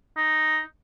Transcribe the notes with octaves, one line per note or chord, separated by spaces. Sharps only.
D#4